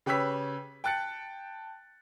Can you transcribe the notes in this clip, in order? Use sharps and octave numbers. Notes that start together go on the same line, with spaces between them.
C#3 G4 B4 C#5 E6 B6
G5 A5 F#6 A6 C#7